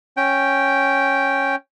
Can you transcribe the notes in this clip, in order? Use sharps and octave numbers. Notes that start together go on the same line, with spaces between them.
C#4 G5